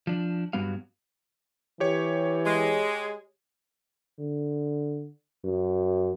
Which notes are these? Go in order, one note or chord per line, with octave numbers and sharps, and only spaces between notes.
F3 D4
G2 F#3 G3 B3 F#4 F5
E3 G4 C#5
G#3
D3
F#2